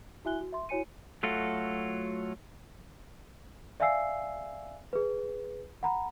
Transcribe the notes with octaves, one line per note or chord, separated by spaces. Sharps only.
E4 F#4 E5 G#5 F#6 G7
F#4
E5 C6
E4 F#4 C#5 G#5 C#7 D#7
F#3 A3 F4 F#4 A4
D5 E5 F5 G#5 E6 C7
G#4 B4
F#5 A#5 B5